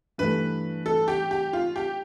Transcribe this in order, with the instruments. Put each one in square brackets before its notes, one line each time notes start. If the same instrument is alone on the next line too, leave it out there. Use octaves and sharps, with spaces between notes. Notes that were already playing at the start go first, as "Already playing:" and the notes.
[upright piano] G2 E3 A3 [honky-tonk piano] B4
[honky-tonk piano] A4
G4
G4
F4
G4